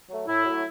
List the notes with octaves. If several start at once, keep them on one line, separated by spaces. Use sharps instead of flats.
F#3 A3
A2 E4
F#3 A3